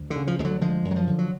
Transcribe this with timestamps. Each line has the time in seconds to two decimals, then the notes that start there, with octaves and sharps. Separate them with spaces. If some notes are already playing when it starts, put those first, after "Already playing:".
Already playing: D2
0.10 D3
0.16 C#3
0.27 F3
0.39 D2 G#3
0.44 D3 F#3
0.61 D3 F3 G#3
0.85 F#2
0.91 F#3
0.96 F3
1.07 D3
1.19 F#3